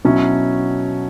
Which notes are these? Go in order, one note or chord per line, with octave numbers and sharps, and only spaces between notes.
B2 F#3 C#4 E4